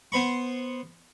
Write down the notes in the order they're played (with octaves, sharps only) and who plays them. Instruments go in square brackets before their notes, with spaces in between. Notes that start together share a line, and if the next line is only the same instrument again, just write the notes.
[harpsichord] B3 C5 B5 C#6